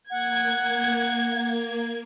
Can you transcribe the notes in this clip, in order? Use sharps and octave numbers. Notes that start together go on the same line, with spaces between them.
A#3 F#5 G#6